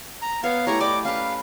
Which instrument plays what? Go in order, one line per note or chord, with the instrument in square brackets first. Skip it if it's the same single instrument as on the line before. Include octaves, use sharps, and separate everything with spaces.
[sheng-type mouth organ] A#5
[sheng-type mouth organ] B3 F5 [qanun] C#5
[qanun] A3 E4 G4 [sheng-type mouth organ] C#5 A#5
[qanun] D5 D#5 G5 [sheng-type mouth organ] D6
[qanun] C#4 B4 [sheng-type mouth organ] F5